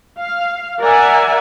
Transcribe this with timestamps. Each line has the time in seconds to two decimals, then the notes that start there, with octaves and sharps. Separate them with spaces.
0.20 F5
0.81 A#4 D5 E5 F#5 G#5